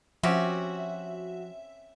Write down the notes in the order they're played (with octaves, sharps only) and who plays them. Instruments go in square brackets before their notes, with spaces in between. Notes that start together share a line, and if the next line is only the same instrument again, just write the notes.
[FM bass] F3 [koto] C4 C#4 G4 [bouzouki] F#4 [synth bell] E5